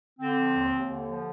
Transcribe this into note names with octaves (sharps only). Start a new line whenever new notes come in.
D3 C4
F3
D#2
D#2
D3
F3